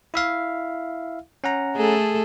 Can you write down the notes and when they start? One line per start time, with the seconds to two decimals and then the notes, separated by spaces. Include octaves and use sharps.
0.14 E4 E5 F5
1.44 C#4 F#5 A#5
1.76 A3 G#4 A4